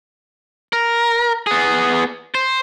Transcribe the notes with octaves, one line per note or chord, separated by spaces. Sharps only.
A#4
B3 G#4
C5